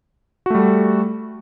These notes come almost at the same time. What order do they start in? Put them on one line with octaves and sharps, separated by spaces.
F#4 A3 G3 A4